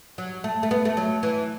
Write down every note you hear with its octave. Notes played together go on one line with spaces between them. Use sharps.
F#3
A3
A3
B3
A3
F#3
E3